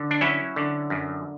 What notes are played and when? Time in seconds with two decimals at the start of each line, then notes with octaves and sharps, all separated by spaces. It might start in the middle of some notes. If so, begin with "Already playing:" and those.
Already playing: D3
0.11 D4
0.21 F#3 C#4 E4
0.56 D3
0.90 F#2